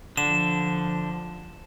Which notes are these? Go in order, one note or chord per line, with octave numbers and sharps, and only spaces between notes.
D3 F3 E7